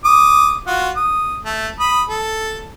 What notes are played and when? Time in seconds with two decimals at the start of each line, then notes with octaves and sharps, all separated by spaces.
0.05 D6 D#6
0.67 F4 F#4 F#5
0.96 D#6
1.46 A3
1.80 B5 D#6
2.09 A4